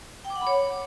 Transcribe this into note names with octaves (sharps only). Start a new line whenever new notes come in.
G5
D6
F#5
B5
C#5